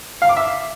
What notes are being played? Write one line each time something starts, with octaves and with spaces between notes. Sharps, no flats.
F5
D6
E5